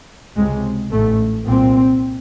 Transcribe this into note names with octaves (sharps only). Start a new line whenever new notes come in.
C#2 C3 G#3
A1 G#2 A3
C2 A#2 C4